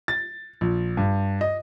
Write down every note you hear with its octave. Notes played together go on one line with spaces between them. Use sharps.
A6
A#1
G2
D#5